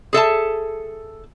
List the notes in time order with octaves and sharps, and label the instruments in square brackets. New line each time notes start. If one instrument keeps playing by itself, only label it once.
[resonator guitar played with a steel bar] G#4 A4 E5 A5